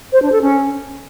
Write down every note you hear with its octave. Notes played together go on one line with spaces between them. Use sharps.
C5
D4
A4
C#4